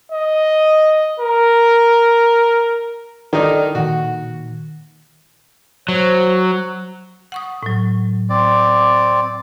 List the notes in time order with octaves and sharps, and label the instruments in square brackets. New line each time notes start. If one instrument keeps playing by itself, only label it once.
[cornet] D#5
A#4
[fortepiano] D#3 D#4 [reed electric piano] A4 D5
[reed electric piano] A#2 D#3 [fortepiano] F#4
[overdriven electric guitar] F#3 [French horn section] C5
[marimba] F#5 C#6 D#6
A2 F#3
[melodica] C4 D5